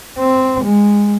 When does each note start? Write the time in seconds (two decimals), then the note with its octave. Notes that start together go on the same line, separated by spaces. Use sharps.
0.19 C4
0.64 G#3